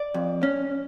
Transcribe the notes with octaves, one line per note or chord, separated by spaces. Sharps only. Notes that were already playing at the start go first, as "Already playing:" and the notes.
Already playing: D5
F2
C#4